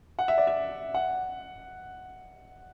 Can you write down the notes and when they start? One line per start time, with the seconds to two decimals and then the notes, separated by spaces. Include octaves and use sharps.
0.19 F#5
0.28 E5
0.38 D5
0.47 E5
0.94 F#5